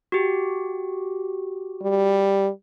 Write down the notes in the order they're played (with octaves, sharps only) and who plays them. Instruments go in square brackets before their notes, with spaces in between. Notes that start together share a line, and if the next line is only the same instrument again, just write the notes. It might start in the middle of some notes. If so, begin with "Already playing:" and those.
[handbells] F#4 G4
[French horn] G3